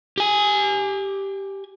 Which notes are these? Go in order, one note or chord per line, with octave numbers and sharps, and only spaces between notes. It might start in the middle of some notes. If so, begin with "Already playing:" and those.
G4 G#5